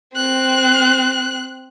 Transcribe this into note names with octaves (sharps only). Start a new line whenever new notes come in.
C4 F#6